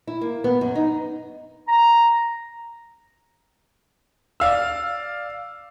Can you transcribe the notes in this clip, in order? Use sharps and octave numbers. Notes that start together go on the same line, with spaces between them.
E4
A#3
B3
F#2
D#4
A#5
D5 F5 E6